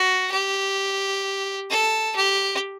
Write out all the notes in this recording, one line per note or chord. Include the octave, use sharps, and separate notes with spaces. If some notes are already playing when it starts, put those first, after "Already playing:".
Already playing: F#4
G4
A4
G4